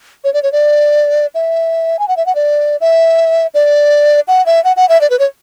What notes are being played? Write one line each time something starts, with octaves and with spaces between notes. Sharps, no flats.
C#5
D5
C#5
D5
E5
G#5
F#5
E5
F#5
D5
E5
D5
F#5
E5
F#5
F#5
E5
D5
B4
C#5